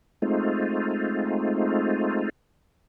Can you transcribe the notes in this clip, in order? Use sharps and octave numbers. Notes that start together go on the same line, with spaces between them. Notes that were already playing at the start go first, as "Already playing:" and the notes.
G#3 A3 C4 D#4 F4